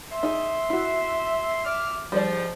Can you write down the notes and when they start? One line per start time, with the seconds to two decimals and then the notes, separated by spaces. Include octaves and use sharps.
0.11 E5 C6
0.23 D#4 G#4
0.70 E4 F#4
1.65 E5 D6 F6
2.12 G#2 F3 G3 C5 D5